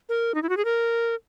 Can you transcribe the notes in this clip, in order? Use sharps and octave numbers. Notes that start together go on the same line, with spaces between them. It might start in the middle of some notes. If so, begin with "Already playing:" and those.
A#4
D#4
E4
F#4
G#4
A#4